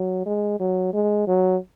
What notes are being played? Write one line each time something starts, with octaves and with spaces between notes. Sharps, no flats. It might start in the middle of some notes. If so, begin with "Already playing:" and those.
Already playing: F#3
G#3
F#3
G#3
F#3